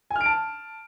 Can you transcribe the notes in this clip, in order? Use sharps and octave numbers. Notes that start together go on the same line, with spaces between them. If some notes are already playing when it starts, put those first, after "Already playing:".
G#5
F6
D7
A5